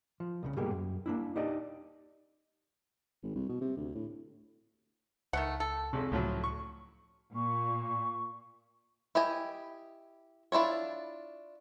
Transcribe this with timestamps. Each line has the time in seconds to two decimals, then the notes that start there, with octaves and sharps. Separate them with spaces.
0.20 F3
0.43 C2 A#2 C#3
0.56 G#2 B2 G3 A#3 G4 G#4
0.71 F#2
1.06 A#3 D4 E4
1.36 D#4 G4 D5 D#5
3.23 G#1
3.35 C2
3.49 B2
3.61 C3
3.77 D2
3.95 A2
5.33 C#2 D#3 A3 F#5
5.60 A4
5.93 G#1 F2 C3
6.12 C#2 A2 F3 F#3
6.44 C#6
7.35 A#2 C#6
9.15 E4 G4 D#5 G#5
10.52 D4 E4 F4 C#5